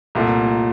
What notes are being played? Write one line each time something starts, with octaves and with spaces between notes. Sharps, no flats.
C2 A#2 A3